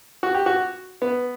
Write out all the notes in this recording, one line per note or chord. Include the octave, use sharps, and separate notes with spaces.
F#4
G4
F#4
B3